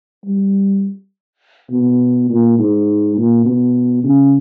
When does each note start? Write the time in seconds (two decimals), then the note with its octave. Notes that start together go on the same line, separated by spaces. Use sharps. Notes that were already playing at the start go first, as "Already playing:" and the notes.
0.25 G3
1.71 B2
2.29 A#2
2.58 G#2
3.17 A#2
3.45 B2
4.04 C#3